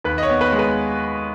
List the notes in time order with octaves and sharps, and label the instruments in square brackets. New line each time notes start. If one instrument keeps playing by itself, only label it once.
[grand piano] D#2 B4
D#5
C#5
B3
B4
G#3
B4